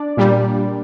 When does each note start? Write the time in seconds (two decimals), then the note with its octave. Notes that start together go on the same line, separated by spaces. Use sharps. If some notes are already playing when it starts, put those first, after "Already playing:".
Already playing: D4 D5
0.17 A#2 G3